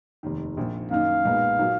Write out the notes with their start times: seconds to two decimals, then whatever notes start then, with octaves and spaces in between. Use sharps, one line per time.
0.23 F1 D#2 D#3
0.57 A#1 A#2 F3
0.91 F#2 D#3 A#3 D#4 F5
1.25 B1 A#2 G#3 B3 D#4
1.59 A#2 F#3 A#3 D#4